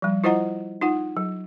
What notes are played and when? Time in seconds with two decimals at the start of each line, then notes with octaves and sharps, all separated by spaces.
0.02 F3 G3
0.24 E4 F4 C5 D#5 F#5 A#5
0.81 D#4 F4 F#5
1.17 F#3